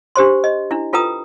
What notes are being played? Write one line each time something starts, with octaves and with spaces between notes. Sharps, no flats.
D4 G4 C5 C6
D#5
D4 E4
F4 A4 B4 G5 A#5 D#6